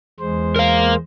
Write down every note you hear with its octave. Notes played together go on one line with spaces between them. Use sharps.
E2 G#3 C5
A#4 F5